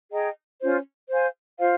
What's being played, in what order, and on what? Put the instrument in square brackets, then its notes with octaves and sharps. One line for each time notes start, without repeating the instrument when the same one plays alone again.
[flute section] G#4 D#5 G5 A#5
C#4 F4 C5
C5 F5 G#5
F4 C5 F5